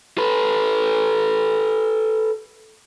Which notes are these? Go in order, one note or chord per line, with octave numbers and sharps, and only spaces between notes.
A4 B4